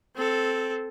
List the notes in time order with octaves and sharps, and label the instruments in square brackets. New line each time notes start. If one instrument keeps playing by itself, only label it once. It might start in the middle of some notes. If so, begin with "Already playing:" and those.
[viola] C4 A4